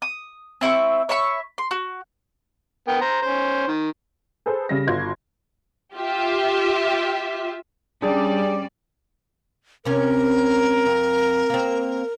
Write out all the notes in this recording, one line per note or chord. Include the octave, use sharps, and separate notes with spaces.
D#6
C4 E4 E5 C#6
C#5 E5 B5 C#6
C6
F#4
B3 A#4 G5
C5 A#5
C#4 C5
D#3
G#4 A4 B4 C5
C#3 G3 A#6
G1 F4 F#4 C6 G#6
F4 G4 E5
G3 C#4 D4 G#4 D5
C3 C#4 A#4
F2
A#3 C4